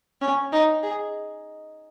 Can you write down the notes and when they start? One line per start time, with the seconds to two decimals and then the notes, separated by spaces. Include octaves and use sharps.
0.21 C#4
0.52 D#4
0.83 G#4